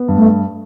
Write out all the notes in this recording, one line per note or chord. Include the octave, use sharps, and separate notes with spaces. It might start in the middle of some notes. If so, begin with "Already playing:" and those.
Already playing: B3
G2
A3